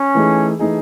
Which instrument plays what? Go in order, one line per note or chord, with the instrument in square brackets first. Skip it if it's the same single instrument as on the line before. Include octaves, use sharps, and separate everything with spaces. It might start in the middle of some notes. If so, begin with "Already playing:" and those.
Already playing: [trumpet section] C#4
[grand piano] E3 A3 D#4 G#4
E3 A3 D#4 G#4